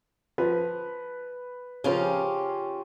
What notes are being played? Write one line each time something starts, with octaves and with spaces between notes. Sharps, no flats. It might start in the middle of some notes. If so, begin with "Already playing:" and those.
F3 B4
C#3 F3 C#4 F4 G4